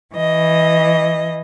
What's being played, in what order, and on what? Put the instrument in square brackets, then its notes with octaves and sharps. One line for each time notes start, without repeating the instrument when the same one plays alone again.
[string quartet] E3 D#5